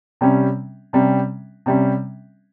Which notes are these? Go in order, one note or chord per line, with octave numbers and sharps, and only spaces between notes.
C3 G3 C#4
C3 G3 C#4
C3 G3 C#4